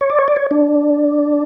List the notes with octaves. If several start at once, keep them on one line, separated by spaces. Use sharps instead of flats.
C#5
D5
C#5
D5
C#5
D4